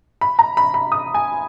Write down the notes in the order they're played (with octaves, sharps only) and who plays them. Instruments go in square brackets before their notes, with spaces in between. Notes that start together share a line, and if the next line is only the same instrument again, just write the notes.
[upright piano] B5
A#5
B5
B5
D#6
G#5